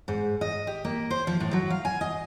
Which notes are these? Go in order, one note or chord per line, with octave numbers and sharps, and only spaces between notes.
G#2
D#5
G4
A#3
C5
F3
A2
F#3
F5
G#5
D#5